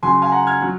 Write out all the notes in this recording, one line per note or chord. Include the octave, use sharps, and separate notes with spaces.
C#3 F#3 G#5 C6
F5 G#5
F#5 A#5
F6 G#6
F#3